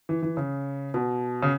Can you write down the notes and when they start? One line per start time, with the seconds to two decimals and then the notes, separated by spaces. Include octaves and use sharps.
0.09 E3
0.22 E3
0.37 C#3
0.94 B2
1.43 C#3